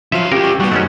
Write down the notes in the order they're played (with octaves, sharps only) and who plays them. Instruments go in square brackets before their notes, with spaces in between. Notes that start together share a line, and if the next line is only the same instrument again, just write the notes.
[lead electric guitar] D3 F5 [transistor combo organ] F3 [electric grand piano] F#3 F6 [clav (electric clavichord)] E5
[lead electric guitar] C#4 F4 [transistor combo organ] G4 [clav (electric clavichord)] A#4
[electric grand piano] G1 C#6
[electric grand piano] D#2 B3 [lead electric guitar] G3 [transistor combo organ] F#4
[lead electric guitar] F#2 [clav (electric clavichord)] A3 B3 C#4 [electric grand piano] D#4 G#4